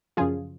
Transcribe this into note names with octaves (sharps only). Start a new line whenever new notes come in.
F#2 C#3 F3 F4 G#4